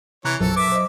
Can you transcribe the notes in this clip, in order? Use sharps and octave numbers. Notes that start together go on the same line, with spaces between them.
C3 E3 C#5 A#5 F#6
A#1 F#2 B2 F#3 A4
B4 E5 D6
C5 D#5